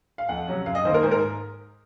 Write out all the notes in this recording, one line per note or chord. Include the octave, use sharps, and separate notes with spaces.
F5
F2 F#5
C3 F#3 C#4
F#2 F5
D#5
D#3 A#3 C5
A#4
G#2 C5
A#4